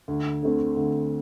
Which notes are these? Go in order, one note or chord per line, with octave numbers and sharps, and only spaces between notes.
D2
D3 A3 C4
D2